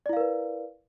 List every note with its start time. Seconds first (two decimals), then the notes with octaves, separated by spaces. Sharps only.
0.06 D5
0.09 E4
0.13 F5
0.17 A#4
0.20 B4